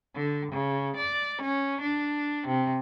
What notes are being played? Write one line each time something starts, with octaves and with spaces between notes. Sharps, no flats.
D3
C#3
D5
C#4
D4
C3